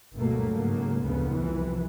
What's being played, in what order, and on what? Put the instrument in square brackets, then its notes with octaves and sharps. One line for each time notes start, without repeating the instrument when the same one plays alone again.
[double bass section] G1 D2 B2 F#3 A3 A#3
G#2 C#3 F#3 A3 A#3
F1 D2 A#2 C#3 B3
C2 E3 F3